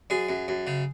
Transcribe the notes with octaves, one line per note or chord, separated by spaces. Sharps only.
F#2 G#4
F#2
F#2
C#3